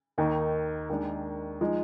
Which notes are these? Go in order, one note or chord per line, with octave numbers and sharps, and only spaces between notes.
D#2 D#3 A#3 D#4
D#2 D#3 G#3 D4
F3 G#3 D#4